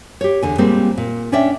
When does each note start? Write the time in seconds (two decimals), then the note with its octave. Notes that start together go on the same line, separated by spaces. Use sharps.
0.21 G4 C#5
0.42 E2 D3 G#5
0.58 A#2 G3 G#3 A#3 C4
0.97 A#2
1.32 C#4 D4 C#5 D5 E5 G5